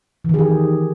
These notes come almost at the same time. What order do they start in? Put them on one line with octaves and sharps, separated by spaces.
E3 D#3 G#4 G4